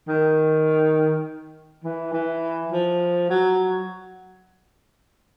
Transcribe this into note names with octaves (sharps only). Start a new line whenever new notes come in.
D#3
E3
E3
F3
F#3